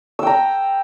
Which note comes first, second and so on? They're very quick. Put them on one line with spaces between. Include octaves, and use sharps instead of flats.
E6 G5 A#5